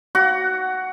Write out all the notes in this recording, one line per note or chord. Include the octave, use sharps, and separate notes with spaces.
F#4